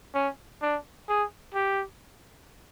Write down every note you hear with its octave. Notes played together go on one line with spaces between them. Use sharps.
C#4
D4
G#4
G4